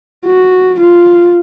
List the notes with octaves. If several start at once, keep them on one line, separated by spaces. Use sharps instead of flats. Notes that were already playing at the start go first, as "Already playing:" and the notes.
F#4
F4